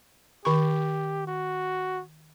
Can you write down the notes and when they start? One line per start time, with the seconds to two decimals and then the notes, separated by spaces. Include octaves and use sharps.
0.45 D#3 G4 C#6
1.27 F#4